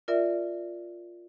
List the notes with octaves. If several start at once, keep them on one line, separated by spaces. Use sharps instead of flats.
F4 A#4 D5 E5